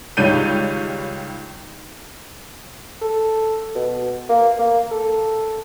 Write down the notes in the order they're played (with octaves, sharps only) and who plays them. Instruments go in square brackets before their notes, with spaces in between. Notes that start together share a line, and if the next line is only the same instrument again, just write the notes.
[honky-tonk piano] C#2 D#3 G3 C#5 G6 D#7
[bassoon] A4
B2
A#3
A#3
A4